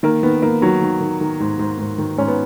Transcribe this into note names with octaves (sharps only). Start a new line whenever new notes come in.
D#3 A#3
D#3 B3
D#3 A#3
D#3 F#3
D#3
D#3
D#3
G#2
G#2
G#2
D#3
G#2 C#4
B3